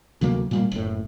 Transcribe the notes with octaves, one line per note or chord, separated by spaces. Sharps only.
D2 C3 F#3 A#3
A#2 G3 A#3
F#1 A2